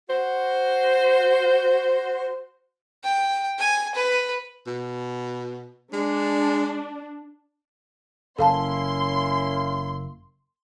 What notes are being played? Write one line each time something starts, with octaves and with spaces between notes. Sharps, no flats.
F#4 C5
G5
G#5
B4
B2
G#3 D4
F#1 A#3 C#4 E4 A4 F5 A5 C6